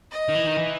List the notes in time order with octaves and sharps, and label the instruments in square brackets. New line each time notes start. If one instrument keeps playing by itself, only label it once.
[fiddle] D#5
[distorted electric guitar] D#3
E3
D#3
E3